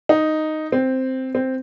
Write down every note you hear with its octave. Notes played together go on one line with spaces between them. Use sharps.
D#4
C4
C4